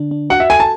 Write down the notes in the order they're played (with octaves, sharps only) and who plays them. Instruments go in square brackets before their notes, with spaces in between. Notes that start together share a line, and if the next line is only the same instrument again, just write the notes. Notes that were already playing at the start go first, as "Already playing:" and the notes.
Already playing: [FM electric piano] D3 D4
D4
[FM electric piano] F#4 [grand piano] F#5
[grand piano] E5
[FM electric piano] A4 [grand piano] G#5
[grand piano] A5